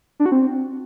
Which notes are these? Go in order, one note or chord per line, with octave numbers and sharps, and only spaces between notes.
D4
F#4
C4